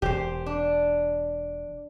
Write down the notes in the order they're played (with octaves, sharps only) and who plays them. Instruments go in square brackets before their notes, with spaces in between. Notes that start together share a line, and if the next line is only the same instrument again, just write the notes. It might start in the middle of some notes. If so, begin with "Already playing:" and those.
[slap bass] E1 [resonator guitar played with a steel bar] G4 C5
[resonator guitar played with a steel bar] D4